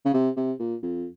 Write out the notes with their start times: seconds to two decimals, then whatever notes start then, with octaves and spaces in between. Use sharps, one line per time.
0.05 C#3
0.14 C3
0.36 C3
0.59 A#2
0.82 F2